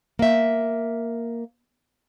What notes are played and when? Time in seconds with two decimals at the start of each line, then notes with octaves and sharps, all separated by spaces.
0.19 A#3 E5